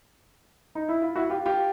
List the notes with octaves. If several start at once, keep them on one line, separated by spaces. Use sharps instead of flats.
D#4
E4
F4
E4 F#4
F4 G4
F4 G4